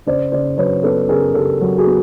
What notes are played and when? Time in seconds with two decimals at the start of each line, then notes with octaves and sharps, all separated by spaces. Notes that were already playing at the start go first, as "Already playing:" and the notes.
0.06 C#3 C5 D5
0.32 C#3 C5 D5
0.58 F#3 B4 C#5
0.84 B3 A4 B4
1.09 C#3 G#4 A#4
1.35 C#3 G4 A4
1.61 F#3
1.78 F#4 G#4
1.87 B3